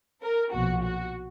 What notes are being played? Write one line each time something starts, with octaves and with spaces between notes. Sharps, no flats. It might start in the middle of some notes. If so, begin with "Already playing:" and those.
A#4
B1 A#2 F3 F#4
F#4